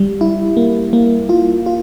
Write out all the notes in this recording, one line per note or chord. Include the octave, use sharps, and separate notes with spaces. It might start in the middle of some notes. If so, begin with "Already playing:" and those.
Already playing: G3
E4
A#3
A#3
F4
F4